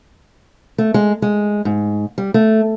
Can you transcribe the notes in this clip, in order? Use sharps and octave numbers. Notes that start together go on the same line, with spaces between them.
A3
G#3
G#3
G#2
G3
A3